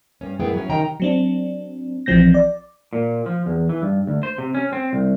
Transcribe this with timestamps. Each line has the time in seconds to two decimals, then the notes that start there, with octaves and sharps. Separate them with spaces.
0.21 G2 C#4
0.40 F#2 A2 B3 E4 G#4 G5
0.54 F#3 C#4
0.69 C3 D#3 D#5 G5 A#5
1.00 F#3 C4 D4
2.06 A#1 E3 F3 C4 G6 A#6
2.34 D5
2.93 A#2
3.26 F3
3.46 E2
3.69 E3
3.82 G2
4.07 D2
4.23 C5
4.38 C3
4.55 C#4
4.73 C4
4.93 C2